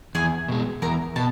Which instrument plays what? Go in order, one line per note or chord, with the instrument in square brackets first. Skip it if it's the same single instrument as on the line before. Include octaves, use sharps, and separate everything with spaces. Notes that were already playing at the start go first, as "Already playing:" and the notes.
[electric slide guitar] E2 [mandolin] G#4 G#5
[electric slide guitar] B2 G#3
[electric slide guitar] E2 [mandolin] A#4 A#5
[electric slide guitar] B2 [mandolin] A5